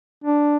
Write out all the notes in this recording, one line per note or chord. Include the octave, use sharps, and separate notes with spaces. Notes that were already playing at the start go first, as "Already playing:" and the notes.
D4